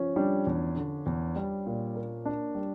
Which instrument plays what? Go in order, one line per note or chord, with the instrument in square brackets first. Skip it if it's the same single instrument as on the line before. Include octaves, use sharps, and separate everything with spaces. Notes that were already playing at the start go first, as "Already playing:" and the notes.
Already playing: [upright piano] F3 C#4
[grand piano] G3 [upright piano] D4
[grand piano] E2
D3
E2
G3
A#2
A#3
D4
G3